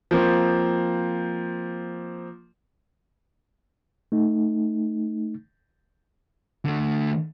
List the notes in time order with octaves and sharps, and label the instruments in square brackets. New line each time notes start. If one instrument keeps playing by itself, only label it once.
[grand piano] F3 A#3 C4
[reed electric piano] A3 D#4
[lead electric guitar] D3 A3